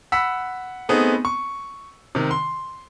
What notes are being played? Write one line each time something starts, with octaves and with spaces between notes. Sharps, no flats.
F#5 B5 E6 B6
A3 B3 C4 D#4 G#4
C#6
C3 D#3
C6